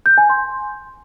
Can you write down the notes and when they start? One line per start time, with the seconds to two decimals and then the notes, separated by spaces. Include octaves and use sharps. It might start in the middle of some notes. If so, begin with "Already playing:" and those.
0.06 G6
0.18 G#5
0.30 C6